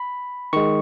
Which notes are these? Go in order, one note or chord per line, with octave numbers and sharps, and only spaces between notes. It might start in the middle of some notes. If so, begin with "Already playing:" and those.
Already playing: B5
D#3 G#3 C#6